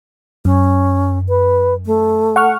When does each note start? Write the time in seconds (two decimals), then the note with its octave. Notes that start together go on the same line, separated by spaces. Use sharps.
0.45 F#2 C#4
1.29 B4
1.86 A3
2.36 F#5 C#6 F6